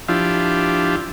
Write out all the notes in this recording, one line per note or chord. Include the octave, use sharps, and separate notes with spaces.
F3 D4 E4 F4 G4